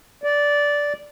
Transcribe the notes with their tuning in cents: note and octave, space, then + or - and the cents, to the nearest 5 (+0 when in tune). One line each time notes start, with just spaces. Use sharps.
D5 -10